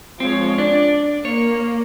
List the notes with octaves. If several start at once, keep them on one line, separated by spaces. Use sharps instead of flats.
F3 G#3 C4 C#5
D4 D5
A#3 C#5